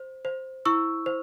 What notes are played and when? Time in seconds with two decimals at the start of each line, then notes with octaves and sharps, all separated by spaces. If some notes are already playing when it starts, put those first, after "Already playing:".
Already playing: C5
0.25 C5
0.65 E4 C#6 E6
1.06 C5